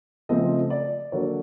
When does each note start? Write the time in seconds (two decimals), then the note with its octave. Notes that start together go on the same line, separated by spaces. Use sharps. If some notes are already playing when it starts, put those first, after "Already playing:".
0.29 C#3 F3 A3 C4 D#5
0.70 D5
1.12 D3 F#3 A#3 C#5